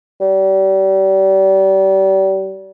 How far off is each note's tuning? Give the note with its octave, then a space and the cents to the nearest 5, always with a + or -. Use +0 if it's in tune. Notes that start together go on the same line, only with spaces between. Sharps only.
G3 -35